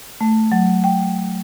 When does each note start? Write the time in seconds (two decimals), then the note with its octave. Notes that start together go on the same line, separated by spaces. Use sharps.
0.21 A3
0.52 F#3
0.84 G5